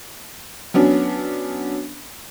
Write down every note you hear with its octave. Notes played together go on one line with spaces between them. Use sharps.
F#3 B3 C#4 D4